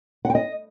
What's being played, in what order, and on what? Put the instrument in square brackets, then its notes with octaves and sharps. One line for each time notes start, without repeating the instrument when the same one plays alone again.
[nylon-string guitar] F#5
G5
D#5